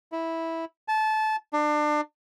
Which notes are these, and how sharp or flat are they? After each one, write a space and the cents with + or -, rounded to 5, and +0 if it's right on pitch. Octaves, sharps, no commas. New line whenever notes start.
E4 -10
A5 -20
D4 +30